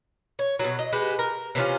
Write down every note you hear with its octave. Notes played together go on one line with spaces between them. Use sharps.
C#5
B2 F#3
D#5
G#3 F#4 G4 B4
A#4
C3 E3 C#4 F4